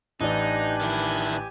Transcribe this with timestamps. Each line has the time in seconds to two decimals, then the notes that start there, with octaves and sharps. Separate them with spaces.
0.21 A1 E3 D4 D#4 G4 D5 G#5 F#6
0.81 D#3 E4